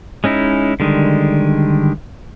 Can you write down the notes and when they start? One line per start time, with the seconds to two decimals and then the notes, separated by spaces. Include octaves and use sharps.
0.24 G#3 C#4 D#4 E4
0.80 D3 D#3 G3 G#3